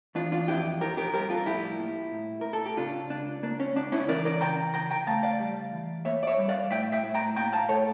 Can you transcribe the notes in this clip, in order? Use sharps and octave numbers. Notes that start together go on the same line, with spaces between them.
E3 D4 F4
D4 F4
F2 E4 G4
F2 G4 A#4
G4 A#4
G3 G4 A#4
F4 A4
A2 E4 G4
A#3
A2
A2 A#4
A4
G4
C#3 D4 F4
C#2 D4
A#3 D4
C#4
C#2 D4
C#4 E4
E3 A#4 D5
A#4 D5
C#3 G5 A#5
C#3 G5 A#5
G5 A#5
A3 F5 A5
D5 F5
G3
E3
A#3 C#5 E5
D5
C#5 E5
G3
D5 F5
A2 E5 G5
E5 G5
A2
G5 A#5
A#3 G5 A#5
F5 A5
A2 A4 C#5